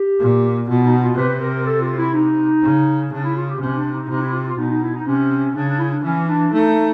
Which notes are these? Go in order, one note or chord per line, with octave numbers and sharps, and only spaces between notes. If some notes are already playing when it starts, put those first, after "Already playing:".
Already playing: G4
A#2
B2 F4
D#4
F4
C3 B4
A#4
A4
F4
E4
D#4
C#3
C#3 D4
E4
F4
G4
C3 C#4
D4
D#4
C3 D#4
E4
F4
F4
B2 D#4
D#4
E4
D#4
C3 C#4
C#3 D4
D4
E4
D4
E3 C#4
D4
A3 D#4